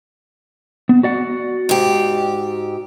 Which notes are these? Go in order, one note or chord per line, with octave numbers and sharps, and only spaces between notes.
B3
F#4 D5 F#5
G#2 G4